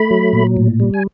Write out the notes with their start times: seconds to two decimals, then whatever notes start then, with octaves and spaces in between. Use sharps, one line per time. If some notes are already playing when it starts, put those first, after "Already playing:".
Already playing: A3 B5
0.11 F#3
0.33 A#2
0.57 A2
0.80 G3
0.94 G#5